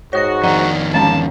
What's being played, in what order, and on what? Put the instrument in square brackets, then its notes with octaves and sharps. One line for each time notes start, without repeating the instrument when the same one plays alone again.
[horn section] G#2 F#4 [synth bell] C#5 D#6 A#6
[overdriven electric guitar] F2 D#3 [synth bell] D5 F#5 A#5
[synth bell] E3 G#3 C#4 [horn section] A5